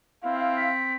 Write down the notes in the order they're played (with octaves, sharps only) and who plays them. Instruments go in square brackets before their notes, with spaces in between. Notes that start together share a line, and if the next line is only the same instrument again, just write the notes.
[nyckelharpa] C4 [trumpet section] E4 F5
[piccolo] B6